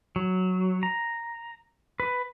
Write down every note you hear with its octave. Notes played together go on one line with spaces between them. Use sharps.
F#3
A#5
B4